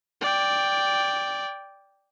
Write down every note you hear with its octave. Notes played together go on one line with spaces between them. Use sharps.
D5 G5